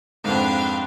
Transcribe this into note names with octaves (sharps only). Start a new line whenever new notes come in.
F2 G#2 D4 B4 F5 G5